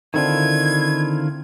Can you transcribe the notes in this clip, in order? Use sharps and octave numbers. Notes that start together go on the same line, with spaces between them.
D3 D#3 C4 D4 E4 F4 G#6